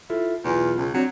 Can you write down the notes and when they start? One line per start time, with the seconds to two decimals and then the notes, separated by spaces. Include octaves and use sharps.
0.10 E4 F4 A4
0.45 B1 E2 F4
0.78 C#2
0.94 F#3 C4 D4